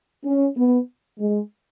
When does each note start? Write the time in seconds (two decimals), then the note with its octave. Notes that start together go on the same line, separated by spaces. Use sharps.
0.25 C#4
0.57 B3
1.19 G#3